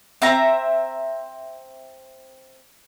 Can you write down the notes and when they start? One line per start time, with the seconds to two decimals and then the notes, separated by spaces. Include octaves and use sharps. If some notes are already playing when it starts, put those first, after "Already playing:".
0.22 C4 E5 A#5